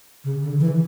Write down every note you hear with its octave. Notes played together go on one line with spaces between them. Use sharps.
C#3
D3
E3